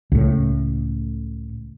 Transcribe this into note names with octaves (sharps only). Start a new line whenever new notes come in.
C#2 A2